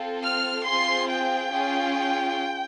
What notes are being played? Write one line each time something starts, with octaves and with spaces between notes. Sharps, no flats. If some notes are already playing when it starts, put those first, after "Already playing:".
Already playing: C4 F4 A4
F6
C4 F4 G#4 C6
G5
C#4 F4 G#4